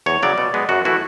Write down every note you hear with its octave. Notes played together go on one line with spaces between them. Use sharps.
E2 C#5
C#3 F#3 D5
B2
G#3 B3
F#2 F#4
E3 A3 E4 F#4